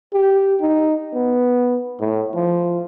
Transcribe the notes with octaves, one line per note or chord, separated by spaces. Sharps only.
G4
D#4
B3
A2
F3